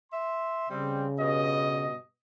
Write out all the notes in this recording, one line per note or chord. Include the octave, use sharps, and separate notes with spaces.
E5 C6
C#3 G3 C4
G2 B2 D#5